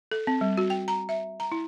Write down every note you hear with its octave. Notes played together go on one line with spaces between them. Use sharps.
A4
C4
G3
F#4
G5
A#5
E5
A#5
E4